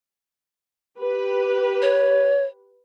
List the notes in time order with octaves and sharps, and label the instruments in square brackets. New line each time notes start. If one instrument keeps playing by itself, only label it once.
[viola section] G4 B4
[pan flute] C#5